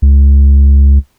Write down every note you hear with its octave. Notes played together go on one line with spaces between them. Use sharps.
C#2